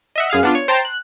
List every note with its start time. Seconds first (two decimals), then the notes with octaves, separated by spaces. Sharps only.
0.16 D#5 E5 F#5
0.30 F#2 G#4 F5 F6
0.43 B3 D4 F4
0.55 C#5
0.68 C5 G5 A5 A#5 C6
0.85 F#6